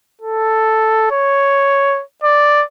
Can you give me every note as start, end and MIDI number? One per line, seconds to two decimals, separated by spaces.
0.21 1.07 69
1.11 2.02 73
2.24 2.64 74